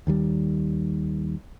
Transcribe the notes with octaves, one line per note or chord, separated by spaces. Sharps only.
D#2 D#3 G3